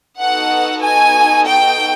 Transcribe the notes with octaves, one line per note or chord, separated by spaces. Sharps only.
B3 D#4 F#4 A4 F#5
G#5
G5